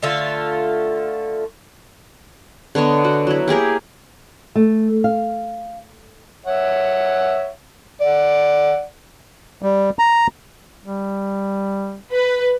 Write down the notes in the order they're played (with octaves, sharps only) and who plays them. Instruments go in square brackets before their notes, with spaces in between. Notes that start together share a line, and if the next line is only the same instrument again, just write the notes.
[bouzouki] D3 A3 F4 E5
[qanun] D3 B3 C#5 D#5
F#4
F#3 E4
A#3 G4 G#4 A#4
[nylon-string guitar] A3
F5
[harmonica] C#5 E5 F#5
D5 F#5
[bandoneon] G3
A#5
[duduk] G3
[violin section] B4